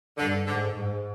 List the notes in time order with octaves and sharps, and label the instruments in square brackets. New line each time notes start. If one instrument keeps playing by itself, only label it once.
[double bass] G2 [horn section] D3
[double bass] G#2 [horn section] D3
[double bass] G#2